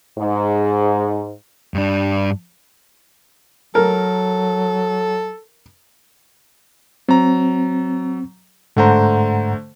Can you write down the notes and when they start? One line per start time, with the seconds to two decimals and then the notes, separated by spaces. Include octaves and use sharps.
0.18 G#2
1.74 G2 D4
3.75 F#3 A4 A#4
7.09 F#3 C4 A#5
8.76 G#2 D3 A3 C5 F#5 A#5